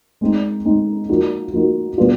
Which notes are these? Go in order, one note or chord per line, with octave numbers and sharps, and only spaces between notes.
G#3 C4 D#4
G#3 C4 D#4
F3 A#3 D#4 F#4
F3 A#3 D#4 F#4
B2 G3 B3 D4 F4